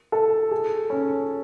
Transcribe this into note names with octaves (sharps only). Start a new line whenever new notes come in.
A4
G#4
C#4